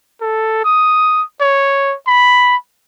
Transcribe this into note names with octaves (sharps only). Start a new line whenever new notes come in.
A4
D#6
C#5
B5